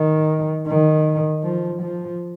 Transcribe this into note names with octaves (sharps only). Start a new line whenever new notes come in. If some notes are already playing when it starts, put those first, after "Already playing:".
Already playing: D#3
D#3
F3
F3